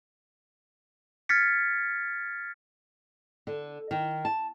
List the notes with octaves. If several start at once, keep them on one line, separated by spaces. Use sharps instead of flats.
F6 G#6 A6 B6 C#7
D3
D#3
A5